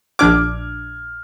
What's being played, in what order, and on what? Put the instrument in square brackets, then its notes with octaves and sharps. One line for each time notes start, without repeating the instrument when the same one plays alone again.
[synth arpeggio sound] A#1 D4 D6 [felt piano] F6 G#6